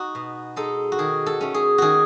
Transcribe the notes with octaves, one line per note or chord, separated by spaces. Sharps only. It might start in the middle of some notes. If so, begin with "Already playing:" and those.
Already playing: D#4 F#4
B2
G#3 D#4 A4
F#4
D#3 G#4
A4
A3 C#4
G#4
D#3 F#4 G#4